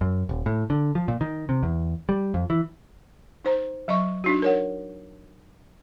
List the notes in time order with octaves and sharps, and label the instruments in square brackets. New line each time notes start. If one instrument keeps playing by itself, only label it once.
[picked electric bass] F#2
D#1
A2
D3
F3
A#2
D#3
C3
E2
G3
F2
E3
[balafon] D#4 C5 A#5
F#3 D#5 E5 C#6
D4 D#4 F#4
A#4 C#5 F#5